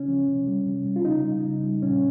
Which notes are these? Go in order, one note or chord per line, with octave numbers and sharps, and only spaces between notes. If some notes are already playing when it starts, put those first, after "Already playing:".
Already playing: C#3 C#4
F3
C3
G3
C3
G3
F4
C#3 D#4
G3
C#3
G3
A#2 C#4